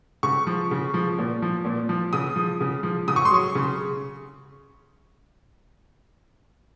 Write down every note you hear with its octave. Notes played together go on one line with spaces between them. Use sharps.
C#3 C#6
F3
C#3
F3
A#2
F3
A#2
F3
C#3 D#6
F3
C#3
F3
C#3 D#6
C#6
C6
F#3 C#6
C#3